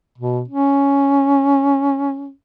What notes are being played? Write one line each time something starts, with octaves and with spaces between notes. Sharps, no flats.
B2
C#4